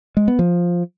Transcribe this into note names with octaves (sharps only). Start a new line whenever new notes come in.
G#3
B3
F3